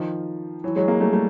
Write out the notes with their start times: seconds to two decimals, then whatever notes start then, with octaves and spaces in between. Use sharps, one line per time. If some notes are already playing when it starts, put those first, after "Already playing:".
Already playing: D#3 F3
0.64 E3 F#3
0.76 F#3 G#3
0.88 G#3 A#3
1.00 G3 A3
1.13 G3 A3